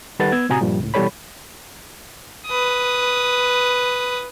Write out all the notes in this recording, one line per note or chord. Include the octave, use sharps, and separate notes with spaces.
D#3 G3 A4 B4 F#5 A6
B3 E6 G#6
A2 C3 F#4 G#5 A#5 D#6
G2 A#2 F3 G3
C#2 A2
B2 E3 G3 A4 C#5 B5
B4 D#6